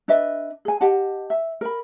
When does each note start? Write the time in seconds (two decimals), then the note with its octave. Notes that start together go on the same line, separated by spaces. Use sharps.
0.08 D4 B4 D#5 E5
0.65 G#4 G#5
0.81 G4 D#5 F#5 A5
1.30 E5
1.61 A#4 B5